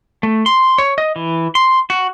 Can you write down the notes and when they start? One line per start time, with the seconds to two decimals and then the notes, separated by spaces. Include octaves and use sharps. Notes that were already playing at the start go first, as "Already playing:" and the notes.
0.23 A3
0.46 C6
0.78 C#5
0.98 D#5
1.16 E3
1.55 C6
1.90 F#4